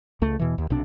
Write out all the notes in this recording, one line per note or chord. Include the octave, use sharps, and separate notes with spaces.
C#2 A3
E2 B2 E3
D#2
B1 C3 D4